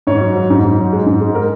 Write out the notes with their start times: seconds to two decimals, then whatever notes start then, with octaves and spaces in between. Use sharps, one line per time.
0.07 G#2 C#5
0.21 F#3
0.36 F#3
0.50 G#2
0.63 G#2
0.78 F#3
0.93 G#3
1.06 G#2
1.21 G#3
1.34 G#3 A#4